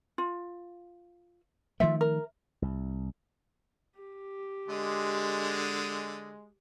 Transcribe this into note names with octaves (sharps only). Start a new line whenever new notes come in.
F4
D#3 F3 A3 F4 E5
A#4
C2
G4
D3 G#3